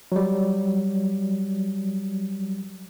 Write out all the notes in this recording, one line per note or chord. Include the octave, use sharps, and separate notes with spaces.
F#3 G3